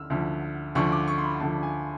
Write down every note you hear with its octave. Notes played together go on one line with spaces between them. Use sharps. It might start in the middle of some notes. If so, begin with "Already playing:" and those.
Already playing: D2 D3 E6 F6
D2 D3 F3
D2 D3 F3 C#6
D6
C#6
C6
B5
D2 D3 F3 A5
G#5